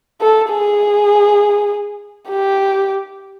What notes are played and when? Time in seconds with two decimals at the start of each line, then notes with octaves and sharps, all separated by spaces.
0.21 A4
0.50 G#4
2.29 G4